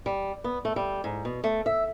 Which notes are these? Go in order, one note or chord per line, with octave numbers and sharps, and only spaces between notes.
G3
B3
A3
G3
G#2
B2
A3
E5